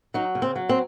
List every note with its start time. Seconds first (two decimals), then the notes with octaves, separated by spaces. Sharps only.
0.14 F#3 D#4
0.35 C#3
0.42 C4
0.56 F#3
0.69 C4